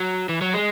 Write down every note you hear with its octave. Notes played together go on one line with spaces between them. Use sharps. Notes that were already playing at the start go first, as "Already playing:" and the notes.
Already playing: F#3
E3
F#3
G#3